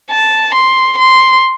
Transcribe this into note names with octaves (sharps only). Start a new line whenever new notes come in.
A5
C6
C6